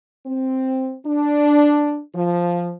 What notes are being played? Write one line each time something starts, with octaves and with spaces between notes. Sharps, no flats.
C4
D4
F3